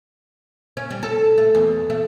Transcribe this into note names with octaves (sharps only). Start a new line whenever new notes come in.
C#4
G3
A4
A3
E2
A3